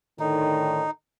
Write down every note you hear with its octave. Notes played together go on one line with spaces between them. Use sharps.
A2 D3 D#3 D#4